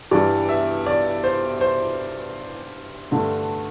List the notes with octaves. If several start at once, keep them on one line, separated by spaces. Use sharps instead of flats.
G2 E3 G3 D5
E5
D5
C5
C5
G2 D3 A3